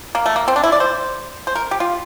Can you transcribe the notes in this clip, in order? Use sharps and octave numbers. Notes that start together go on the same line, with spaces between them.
A#3
A3
A#3
C4
D4
E4
D5
C5
C5
A#4
G4
F4